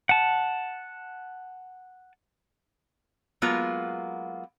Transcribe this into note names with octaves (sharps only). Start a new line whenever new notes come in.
F#5 A5
F#3 G#3 A#3 B3 F4